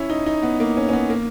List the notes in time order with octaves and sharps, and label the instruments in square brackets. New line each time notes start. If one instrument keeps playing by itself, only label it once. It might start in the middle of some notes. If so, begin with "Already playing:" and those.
Already playing: [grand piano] C#4 E4
D#4
D#4
B3
A#3
C#4
C#4
B3
A#3